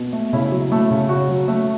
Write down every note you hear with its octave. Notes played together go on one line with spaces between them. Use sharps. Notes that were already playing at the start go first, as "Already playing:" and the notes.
Already playing: B2
A3
C#3 E4
F#3
A3
C#3
C#3 F#4
F#3
A3